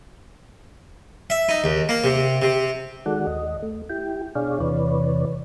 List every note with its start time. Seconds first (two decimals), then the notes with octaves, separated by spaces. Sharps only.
1.30 E5
1.49 D#4
1.64 D#2
1.89 A#3
2.04 C3
2.42 C3
3.06 D#3 G#3 F#4 A4 D5 F#5
3.26 D#2 D#5
3.62 A3
3.90 E4 G4 G5
4.35 B2 D4 G#4 C#5 D5 F5
4.60 E2 C3 E3 B4 C#5 D5